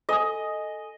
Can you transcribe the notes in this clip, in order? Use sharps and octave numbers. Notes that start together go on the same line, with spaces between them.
A4 D#5 G#5 D#6